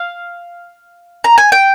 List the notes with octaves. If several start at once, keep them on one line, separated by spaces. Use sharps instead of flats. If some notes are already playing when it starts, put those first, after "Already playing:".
Already playing: F5
A#5
G#5
G5